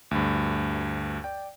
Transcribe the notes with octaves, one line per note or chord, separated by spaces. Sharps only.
D2 G2
D5 G5